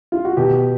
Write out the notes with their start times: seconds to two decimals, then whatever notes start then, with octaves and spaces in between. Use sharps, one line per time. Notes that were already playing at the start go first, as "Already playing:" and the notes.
0.12 F4
0.25 F#4
0.37 B2 G4